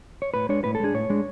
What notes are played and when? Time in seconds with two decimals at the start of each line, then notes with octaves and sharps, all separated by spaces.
0.22 C#5
0.34 A2 B4
0.49 G#3 D4 C#5
0.64 A2 B4
0.75 A4
0.80 G#3 D4 G#4
0.94 A2 C#5
1.10 G#3 D4